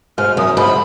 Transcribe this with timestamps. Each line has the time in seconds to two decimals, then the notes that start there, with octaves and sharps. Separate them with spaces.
0.18 G#2 F6
0.37 F#2 D#6
0.57 G#2 B5